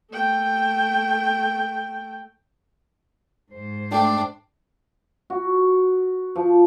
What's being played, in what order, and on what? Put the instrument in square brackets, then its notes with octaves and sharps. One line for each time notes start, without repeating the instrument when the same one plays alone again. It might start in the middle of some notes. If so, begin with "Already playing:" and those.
[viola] A3 G5
[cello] G#2 C5
[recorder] A3 [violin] D4 [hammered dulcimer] A4 G5
[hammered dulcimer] F#4
F3